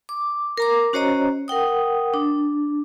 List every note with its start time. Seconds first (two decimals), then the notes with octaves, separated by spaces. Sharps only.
0.09 D6
0.57 A#4 A#5 D6
0.93 C#4 F#4 C5 C#5 D#5 A#5
1.48 A#4 F#5 G5 D#6
2.14 D4